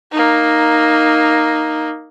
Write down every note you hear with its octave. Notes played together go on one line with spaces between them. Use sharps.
A#3 D#4